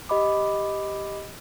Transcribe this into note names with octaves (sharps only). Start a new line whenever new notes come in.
G4 D#5 B5 D6